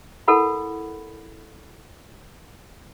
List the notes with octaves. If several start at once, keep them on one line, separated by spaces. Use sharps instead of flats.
E4 A4 A#4 F#5 B5